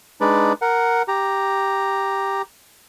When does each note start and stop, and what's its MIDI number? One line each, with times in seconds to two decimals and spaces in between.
0.21 0.53 56
0.21 0.53 62
0.21 0.53 63
0.21 0.53 71
0.21 0.53 74
0.62 1.02 70
0.62 1.02 78
1.08 2.42 67
1.08 2.42 82